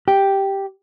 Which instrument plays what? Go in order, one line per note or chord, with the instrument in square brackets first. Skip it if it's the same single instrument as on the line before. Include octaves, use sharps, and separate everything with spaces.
[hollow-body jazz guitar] G4